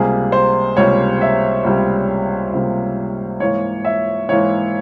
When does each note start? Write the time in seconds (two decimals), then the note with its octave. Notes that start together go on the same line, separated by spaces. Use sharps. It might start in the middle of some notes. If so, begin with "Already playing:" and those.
Already playing: C#2 C3 G3 A#3 G#4
0.32 C5
0.77 C#2 C3 G3 A#3 C#5
1.21 E5
1.64 C#2 C3 G3 A#3
2.52 C#2 C3 G3 A#3
3.40 G#2 E3 A#3 C#5
3.85 E5
4.29 G#2 E3 A#3 C#5